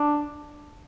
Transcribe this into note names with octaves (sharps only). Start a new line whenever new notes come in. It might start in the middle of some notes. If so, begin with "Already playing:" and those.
Already playing: D4